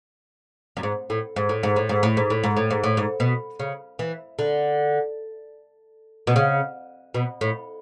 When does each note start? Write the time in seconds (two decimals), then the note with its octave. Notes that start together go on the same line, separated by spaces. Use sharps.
0.77 F#2
0.83 G#2
1.10 A2
1.36 G#2
1.49 A2
1.63 G#2
1.76 A2
1.89 G#2
2.03 A2
2.17 G#2
2.30 A2
2.44 G#2
2.57 A2
2.71 G#2
2.84 A2
2.97 G#2
3.20 B2
3.59 C#3
3.99 E3
4.39 D3
6.27 B2
6.36 C#3
7.14 B2
7.41 A2